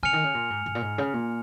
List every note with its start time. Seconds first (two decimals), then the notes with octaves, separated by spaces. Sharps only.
0.03 C#3 G#5 F6 C#7 F7
0.13 D#3
0.24 C#3
0.34 A#2
0.50 G#2
0.66 G#2
0.75 A#2
0.82 G#2
0.98 C#3
1.14 A#2